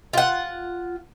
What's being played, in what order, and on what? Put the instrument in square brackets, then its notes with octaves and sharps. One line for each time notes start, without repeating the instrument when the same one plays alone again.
[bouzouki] F4 F#5